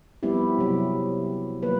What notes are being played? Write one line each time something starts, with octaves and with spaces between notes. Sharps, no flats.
F3 G3 B3 C4 E4 G4
C3 F#3
F3 F#3 A#3 B4